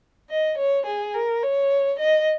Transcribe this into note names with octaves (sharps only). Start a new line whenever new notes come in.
D#5
C#5
G#4
A#4
C#5
D#5